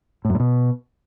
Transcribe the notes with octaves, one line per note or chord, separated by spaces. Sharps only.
A2
F#2
A2
B2